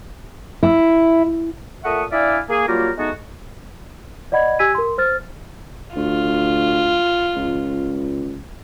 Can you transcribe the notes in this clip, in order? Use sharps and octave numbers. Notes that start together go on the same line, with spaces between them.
E4
A#2 A4 E5 F#5 C#6 D#6
D4 E4 D5 E5 F5 G#5
A#3 G#4
F#3 G3 A#3 F4 G4 A#4
G#3 A3 B3 D#4 F#4
D5 D#5 F#5 B5 G#6
G4 G#5 E6 G#6 B6 D#7
A#4 C6
C5 F6 A6
D2 F4
C#2